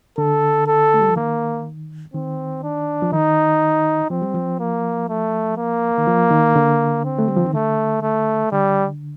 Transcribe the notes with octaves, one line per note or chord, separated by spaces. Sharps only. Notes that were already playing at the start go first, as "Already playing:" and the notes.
D3 A4
A4
A3
G3
F3
D#3 A#3
D#3 C4
D4
F3
D#3 D#4
F3 C4
G3
F3
A#3
A3
A#3
D#3
F3
D#3
D3
C4
A3
G3
F3
D#3
D3 A3
A3
D3 G3